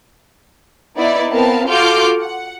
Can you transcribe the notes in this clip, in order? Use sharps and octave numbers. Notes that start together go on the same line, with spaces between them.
B3 D#4 E4 D5
B3 C4 A#4 F5 A5
F4 F#4 A4 D6 F6 G6
F#5